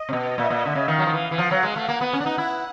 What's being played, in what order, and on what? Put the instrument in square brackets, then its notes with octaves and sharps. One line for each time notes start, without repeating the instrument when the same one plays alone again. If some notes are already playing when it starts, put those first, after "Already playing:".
Already playing: [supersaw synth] D#5
[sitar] C3
B2
[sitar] A#2 [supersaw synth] E5
[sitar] A#2
D3
C#3
[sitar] D#3 [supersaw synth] F5
[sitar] F#3
F3
E3
E3
[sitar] F3 [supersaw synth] F#5
[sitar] F#3
G#3
A3
[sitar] A#3 [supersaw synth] F#5
[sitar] B3
C#4
D4
D#4
E4